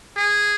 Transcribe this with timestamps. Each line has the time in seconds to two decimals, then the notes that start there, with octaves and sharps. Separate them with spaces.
0.17 G#4